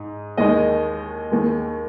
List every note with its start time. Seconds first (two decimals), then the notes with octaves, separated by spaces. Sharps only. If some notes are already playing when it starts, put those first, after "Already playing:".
Already playing: G#2
0.37 D#2 D#3 G#3 D#5
1.31 D#2 D#3 G#3